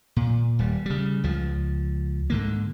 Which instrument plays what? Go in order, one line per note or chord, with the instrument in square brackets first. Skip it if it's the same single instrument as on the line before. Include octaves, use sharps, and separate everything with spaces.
[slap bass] A#2
D#1 G3
C#3 G3
C#2 F3
G#2 D3 A#3